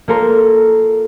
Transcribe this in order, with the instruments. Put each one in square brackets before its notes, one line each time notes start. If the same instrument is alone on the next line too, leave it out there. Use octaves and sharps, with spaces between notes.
[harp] A#3 F4 A4 A#4 C5